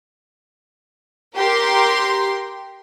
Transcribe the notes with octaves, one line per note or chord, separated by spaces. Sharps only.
G4 A#4 C6